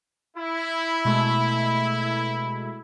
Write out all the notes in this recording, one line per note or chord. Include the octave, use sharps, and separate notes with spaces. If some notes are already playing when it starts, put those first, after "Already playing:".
E4
B2 G#3 A3